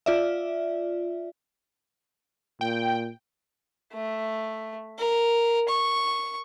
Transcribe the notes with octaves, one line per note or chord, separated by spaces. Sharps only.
F4 D5 E5
A#2 G5
A3
A#4
C#6